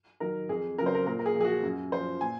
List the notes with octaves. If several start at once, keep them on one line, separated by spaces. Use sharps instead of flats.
D#3 F#3 A#4
F2 G#4
C#3 F#3 A#4 C5
A#4
A#2 A#4
A#4
G#4
F3
G#4
F#4
F#2
F3 C5
A#2 G#5